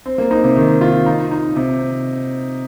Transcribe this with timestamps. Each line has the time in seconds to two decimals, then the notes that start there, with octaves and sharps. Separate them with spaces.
0.06 C4
0.18 A#3
0.31 D#4
0.43 C3
0.56 D#3
0.81 F4
1.06 D#4
1.31 D#4
1.56 C3